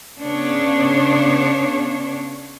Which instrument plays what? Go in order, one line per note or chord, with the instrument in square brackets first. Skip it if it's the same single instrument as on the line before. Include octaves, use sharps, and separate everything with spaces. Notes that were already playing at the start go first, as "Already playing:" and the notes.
[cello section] C#3 B3 D4 C#5